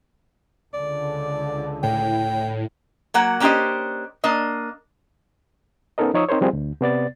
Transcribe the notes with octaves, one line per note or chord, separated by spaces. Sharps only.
C#2 D3 D5
A2 G5
F#3 A#3 F#5
A#3 C#4 D4 G4 C5 D#5
A#3 D4 D#5
B3 C#4 D#4 A4 A#4 D#5
F3 D#4 C#5 C#6 D#6 E6
C4 D#4 A#4 C5 C#5
F3 G3 C4 E4 G#4
D2
C3 B3 D5 A6